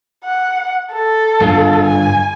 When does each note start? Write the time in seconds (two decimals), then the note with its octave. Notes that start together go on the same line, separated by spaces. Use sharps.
0.25 F#5
0.93 A4
1.41 G2 D3 F4
1.85 G#5